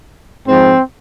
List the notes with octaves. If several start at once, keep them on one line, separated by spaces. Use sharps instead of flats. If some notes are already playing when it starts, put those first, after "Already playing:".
G#2 F3 C4